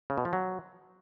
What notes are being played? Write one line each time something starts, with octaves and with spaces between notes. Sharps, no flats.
C#3
B2
F3
F#3